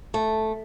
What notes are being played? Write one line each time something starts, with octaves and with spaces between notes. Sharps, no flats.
A3